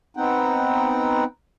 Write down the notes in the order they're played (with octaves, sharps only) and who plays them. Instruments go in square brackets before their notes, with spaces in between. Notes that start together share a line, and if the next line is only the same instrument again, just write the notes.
[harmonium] B3 C4 D#4 F#5 G5